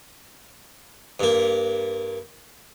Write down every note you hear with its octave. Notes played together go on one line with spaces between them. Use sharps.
G2 A#3